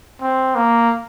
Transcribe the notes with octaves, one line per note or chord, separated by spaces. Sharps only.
C4
A#3